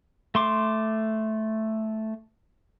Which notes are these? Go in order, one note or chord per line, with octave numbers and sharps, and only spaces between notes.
A3 C6 D6